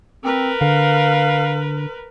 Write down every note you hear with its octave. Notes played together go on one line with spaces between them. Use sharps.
C4 A#4 B4
D3 F5